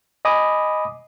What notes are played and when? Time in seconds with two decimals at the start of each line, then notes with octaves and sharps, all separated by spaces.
0.25 D#5 G#5 B5 D6 D#6